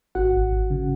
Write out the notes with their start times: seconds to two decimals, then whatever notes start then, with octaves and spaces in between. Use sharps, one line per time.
0.15 G#1 F#4 F#5
0.34 G#1
0.53 G#1
0.71 C#3